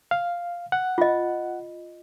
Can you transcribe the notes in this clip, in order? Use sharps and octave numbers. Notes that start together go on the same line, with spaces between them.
F5
F#5
F4 D#5